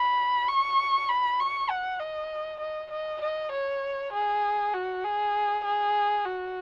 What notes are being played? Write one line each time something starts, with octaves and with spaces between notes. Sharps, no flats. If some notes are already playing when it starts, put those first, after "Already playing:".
Already playing: B5
C#6
B5
C#6
F#5
D#5
D#5
D#5
D#5
C#5
G#4
F#4
G#4
G#4
F#4